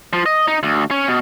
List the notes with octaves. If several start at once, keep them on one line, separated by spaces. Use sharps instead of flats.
F3
D#5
D#4
D2
C#4
B2